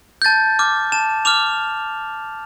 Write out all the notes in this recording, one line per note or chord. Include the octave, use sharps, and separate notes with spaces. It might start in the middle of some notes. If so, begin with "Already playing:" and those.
G6
A5 A6
D6 F6
A5 E7
D6 F6 F7